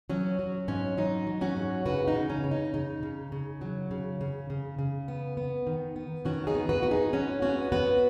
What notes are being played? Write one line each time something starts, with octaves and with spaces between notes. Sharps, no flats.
F#3 C#4
F#3
G#2 C#4
F#3 D#4
F#3
C#4 F#4
G#2
C#3 F#4 B4
D#4
C#3
C#4
C#3
D#4
C#3 D#4
C#3
C#3
F#3
C#3
C#3
C#3
C#3
B3
B3
D#3
B3
D#3 C#4 F#4
D#4 G#4
B3
F#4 B4
G#2 F#4
D#4 G#4
G#3 C#4 F#4
B3 C#4 F#4
B3 F#4 B4